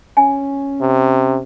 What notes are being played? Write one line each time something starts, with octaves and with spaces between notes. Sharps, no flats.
C#4 G#5
C3